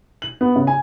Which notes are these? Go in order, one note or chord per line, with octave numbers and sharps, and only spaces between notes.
F#7
B3
C#3
G#5